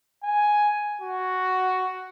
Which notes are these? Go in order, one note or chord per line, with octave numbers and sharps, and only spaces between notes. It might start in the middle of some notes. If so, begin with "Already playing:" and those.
G#5
F#4